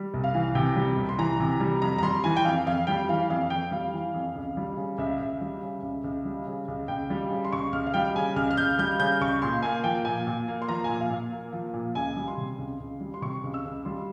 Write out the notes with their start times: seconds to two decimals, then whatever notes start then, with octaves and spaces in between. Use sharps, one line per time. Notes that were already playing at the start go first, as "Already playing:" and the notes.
Already playing: G3
0.14 C2
0.24 F5
0.34 E3
0.55 C3 G5
0.76 G3
0.97 C2
1.09 C6
1.18 E3 A#5
1.40 C3
1.60 G3
1.82 F2 A#5
1.98 A#5
2.03 G3 C6
2.24 E3 G#5
2.37 G5
2.45 F2 F5
2.66 F2 F5
2.87 G3 G5
3.09 E3 F5
3.30 F2 F5
3.50 F2 G5
3.71 G3 F5
3.93 E3
4.14 F2
4.35 C#2
4.57 G3
4.77 C#3
4.98 C#2 E5
5.20 C#2 E5
5.41 G3
5.62 C#3
5.83 C#2
6.04 C#2
6.25 G3
6.47 C#3
6.68 C#2
6.88 C#2 G5
7.10 G3
7.31 C#3
7.45 C6
7.53 C#2 C#6
7.73 C#2 F6
7.87 F5
7.94 G3 G5
8.15 C#3 G#5
8.36 C#2 F6
8.51 F6
8.57 C#2 G6
8.79 G3 G6
9.00 C#3 G6
9.21 C#2 C#6
9.42 A#2 C6
9.63 A#3 G#5
9.84 F3 G5
10.05 A#2 G#5
10.27 A#2
10.48 A#3
10.62 C6
10.69 F3 A#5
10.84 A#2 G#5
11.01 F5
11.10 A#2
11.33 A#3
11.53 F3
11.74 A#2
11.95 C#2 G#5
12.17 G3
12.28 C6
12.37 C3
12.58 C#2
12.80 C#2
13.01 G3
13.14 C6
13.22 C3 C#6
13.44 C#2
13.54 E6
13.65 C#2
13.85 G3 C6